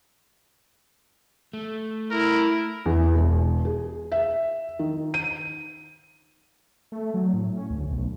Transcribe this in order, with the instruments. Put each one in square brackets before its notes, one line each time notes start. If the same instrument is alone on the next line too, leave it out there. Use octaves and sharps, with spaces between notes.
[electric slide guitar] A3
[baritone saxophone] E4 [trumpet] A#4
[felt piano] E2
E1
G#4
E5
D#3
D#7
[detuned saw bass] A3
F#3
A2
C#4
D2
B1